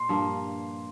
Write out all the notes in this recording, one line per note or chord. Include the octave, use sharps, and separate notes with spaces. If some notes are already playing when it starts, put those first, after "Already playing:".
Already playing: A#2 C6
G2 F3 A#3